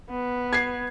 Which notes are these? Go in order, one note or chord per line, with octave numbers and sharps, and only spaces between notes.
B3
G#6 C7